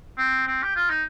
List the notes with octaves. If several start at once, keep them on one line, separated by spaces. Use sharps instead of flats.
C4
C4
G4
F4
D#4